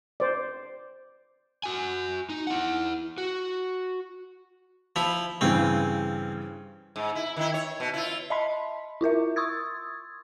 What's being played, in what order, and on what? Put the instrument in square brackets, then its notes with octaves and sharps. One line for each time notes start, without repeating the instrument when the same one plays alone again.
[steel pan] C5 D5
[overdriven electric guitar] F#4 G#5
D#4
E4 F#5
F#4
[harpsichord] F3 E4
[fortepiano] G2 C#3 E3 [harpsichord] C4
[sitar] G#2
E4
D#3 E4
C#5
B2
E4 F4
[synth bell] D#5 E5 A5 B5 C6 B6
E4 F4 A#4 E5
C6 C#6 D#6 E6 G#6 A6